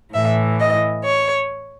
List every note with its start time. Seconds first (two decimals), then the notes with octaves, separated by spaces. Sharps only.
0.14 A2 E3 E5
0.60 D#5
1.05 C#5